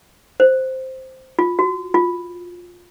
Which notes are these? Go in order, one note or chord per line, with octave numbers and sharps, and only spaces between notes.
C5
F4
F#4
F4